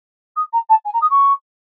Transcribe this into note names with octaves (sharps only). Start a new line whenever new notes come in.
D#6
A#5
A5
G#5
A#5
D#6
C#6